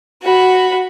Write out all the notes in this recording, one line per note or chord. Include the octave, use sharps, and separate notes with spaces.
F#4 B5